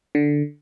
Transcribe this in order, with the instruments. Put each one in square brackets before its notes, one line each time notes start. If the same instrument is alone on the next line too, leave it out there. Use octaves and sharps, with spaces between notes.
[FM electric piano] D3